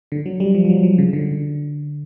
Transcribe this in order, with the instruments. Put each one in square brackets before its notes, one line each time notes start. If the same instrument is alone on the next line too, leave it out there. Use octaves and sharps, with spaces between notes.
[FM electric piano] D3
F#3
G3
F3
F3
F#3
F3
C#3
D3